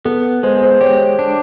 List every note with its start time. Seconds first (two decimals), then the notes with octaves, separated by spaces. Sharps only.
0.05 B3 A4
0.43 G#3 C5
0.63 C5
0.81 G4 C#5
1.19 D4